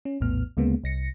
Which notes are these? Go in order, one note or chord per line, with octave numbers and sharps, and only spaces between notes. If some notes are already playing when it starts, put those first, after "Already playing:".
C#4
A#1 E2 A2 B3 F6
D2 C#3 G#3 A#3 B3
C2 A#6 C#7